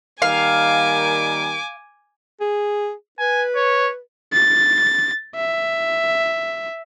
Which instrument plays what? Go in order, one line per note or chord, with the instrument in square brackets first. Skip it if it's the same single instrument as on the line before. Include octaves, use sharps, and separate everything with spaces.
[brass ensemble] D#3 G3 A#3 [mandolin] F5 [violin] G#5 D6
[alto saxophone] G#4
[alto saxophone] B4 [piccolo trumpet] G#5
[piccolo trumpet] C#5
[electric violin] A6
E5